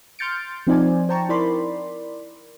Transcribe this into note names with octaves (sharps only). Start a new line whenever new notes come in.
C6 F6 G6 A6 C#7 D7
F3 C4 D#4 C5 D5 G#5
C5 G5 A5 A#5 C#6
E4 A#4 D5 B5 C6